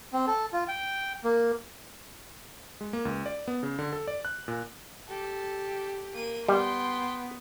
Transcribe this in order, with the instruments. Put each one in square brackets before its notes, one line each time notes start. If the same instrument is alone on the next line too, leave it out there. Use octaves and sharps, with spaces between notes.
[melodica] C4
A4
F4
G5
A#3
[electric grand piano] G#3
A#3
C#2
D5
B3
C#3
D3
A4
D5
F#6
A#2
[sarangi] G4 [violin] A4
[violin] A#3 D#7
[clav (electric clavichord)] G3 [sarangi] B3 [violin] G5 C6